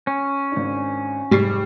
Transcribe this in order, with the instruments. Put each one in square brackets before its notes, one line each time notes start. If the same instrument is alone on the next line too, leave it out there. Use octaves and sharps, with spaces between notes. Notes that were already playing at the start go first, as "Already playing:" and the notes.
[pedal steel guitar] C#4
[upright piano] G#1 D4
[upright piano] F1 C#6 C7 [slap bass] G#2 [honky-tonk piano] G3